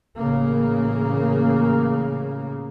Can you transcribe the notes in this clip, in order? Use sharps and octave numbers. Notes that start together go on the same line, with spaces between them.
A1 C#3 A#3